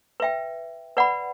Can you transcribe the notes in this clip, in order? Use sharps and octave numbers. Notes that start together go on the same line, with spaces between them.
B4 E5 G5
B4 D5 F#5 B5